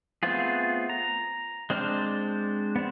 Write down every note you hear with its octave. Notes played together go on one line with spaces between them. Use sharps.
A3 B3 C4 F4 G#4
A#5
G#3 C4 D4 C5 F6
B3 C4